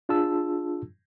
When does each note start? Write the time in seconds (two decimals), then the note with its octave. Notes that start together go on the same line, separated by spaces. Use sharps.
0.09 D4 F4 G#4 A5 E6